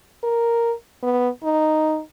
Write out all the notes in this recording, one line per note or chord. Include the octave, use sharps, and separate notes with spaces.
A#4
B3
D#4